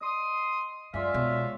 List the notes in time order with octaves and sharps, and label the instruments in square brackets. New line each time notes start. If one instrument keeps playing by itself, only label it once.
[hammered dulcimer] D#5 [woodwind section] C6 D#6
[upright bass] F#2 [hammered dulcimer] G#3 D5 G#5 [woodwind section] F4 E5 F5
[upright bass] B2 [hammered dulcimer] C#5